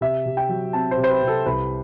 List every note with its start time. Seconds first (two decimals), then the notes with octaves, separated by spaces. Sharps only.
0.01 C3 E5
0.26 C3
0.37 G5
0.49 F#3
0.73 C4 A5
0.91 C5
0.98 C3
1.04 C5
1.09 B4
1.22 C3
1.27 A4
1.46 C2 B4